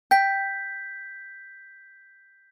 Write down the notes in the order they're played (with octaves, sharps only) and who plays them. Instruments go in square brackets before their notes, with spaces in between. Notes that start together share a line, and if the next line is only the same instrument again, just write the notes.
[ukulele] G5 [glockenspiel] G6 B6